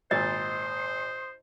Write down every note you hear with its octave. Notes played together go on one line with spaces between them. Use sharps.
G#1 A#2 C5 D#5 C6 D#6